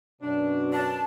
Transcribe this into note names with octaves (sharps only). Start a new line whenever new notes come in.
F#2 B2 D4
D4 A5